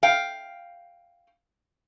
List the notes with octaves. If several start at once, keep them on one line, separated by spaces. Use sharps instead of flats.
F5 G5